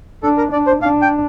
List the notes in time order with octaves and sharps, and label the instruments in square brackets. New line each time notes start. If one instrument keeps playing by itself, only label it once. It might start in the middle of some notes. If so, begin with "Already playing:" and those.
[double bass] D4 [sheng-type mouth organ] A4
[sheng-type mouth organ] A#4
[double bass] D4 [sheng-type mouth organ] D5
[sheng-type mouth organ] C5
[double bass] D4 [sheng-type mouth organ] F5
[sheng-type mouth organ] G5